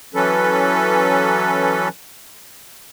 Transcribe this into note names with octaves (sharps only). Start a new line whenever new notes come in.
E3 F#3 C#4 A4 B4